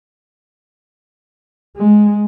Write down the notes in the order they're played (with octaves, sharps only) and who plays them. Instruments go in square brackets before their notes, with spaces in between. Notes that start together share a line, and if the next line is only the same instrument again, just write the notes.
[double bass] G#3